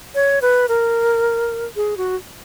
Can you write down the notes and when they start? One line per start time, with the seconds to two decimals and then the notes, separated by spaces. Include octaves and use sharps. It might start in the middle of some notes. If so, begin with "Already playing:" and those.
0.15 C#5
0.42 B4
0.69 A#4
1.76 G#4
1.97 F#4